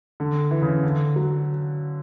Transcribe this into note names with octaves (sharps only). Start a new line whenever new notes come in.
D3
E3
C#3
D3
F#3